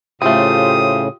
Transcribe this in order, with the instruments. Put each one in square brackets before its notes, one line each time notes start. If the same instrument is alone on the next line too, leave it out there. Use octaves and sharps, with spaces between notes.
[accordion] A2 C#3 [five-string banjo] A3 C4 [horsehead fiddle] F4 G4 [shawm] D#6